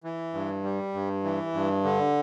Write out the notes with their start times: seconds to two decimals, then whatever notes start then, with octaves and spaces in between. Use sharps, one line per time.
0.04 E3
0.34 G2
0.64 G3
0.94 G2
1.24 E3
1.54 G2
1.84 D3